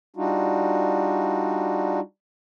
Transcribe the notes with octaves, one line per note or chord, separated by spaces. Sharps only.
G3 D4 D#4 F4 F#4